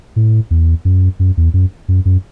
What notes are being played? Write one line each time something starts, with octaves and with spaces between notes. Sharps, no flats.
A2
E2
F#2
F#2
E2
F#2
F#2
F#2